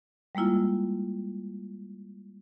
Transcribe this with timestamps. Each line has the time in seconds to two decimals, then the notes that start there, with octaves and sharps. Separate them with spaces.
0.35 G3 G#3 A#3 E4 F4